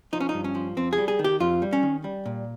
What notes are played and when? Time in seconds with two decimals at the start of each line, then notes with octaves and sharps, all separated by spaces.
0.13 F3 D#4
0.20 C#4
0.29 D#4
0.34 G2
0.44 C#4
0.55 F3
0.77 F2 C4
0.93 G#4
0.98 G3
1.08 G#4
1.19 D#3
1.24 G4
1.40 F2 F4
1.62 G3
1.73 C#4
1.83 D#3
2.04 G3
2.26 A#2